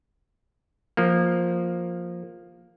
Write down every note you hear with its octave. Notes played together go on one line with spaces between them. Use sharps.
F3 A#3